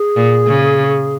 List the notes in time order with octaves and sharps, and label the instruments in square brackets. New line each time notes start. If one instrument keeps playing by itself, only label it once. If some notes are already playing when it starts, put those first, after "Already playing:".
Already playing: [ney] G#4
[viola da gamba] A#2
C#3